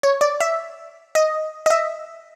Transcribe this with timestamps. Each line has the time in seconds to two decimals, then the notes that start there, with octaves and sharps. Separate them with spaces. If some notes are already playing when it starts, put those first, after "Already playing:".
0.03 C#5
0.21 D5
0.40 E5
1.15 D#5
1.66 D#5
1.70 E5